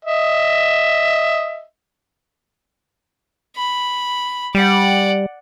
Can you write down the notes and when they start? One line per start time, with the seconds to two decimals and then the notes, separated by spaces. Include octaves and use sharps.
0.05 D#5 E5
3.56 B5
4.55 G3 D5 F#5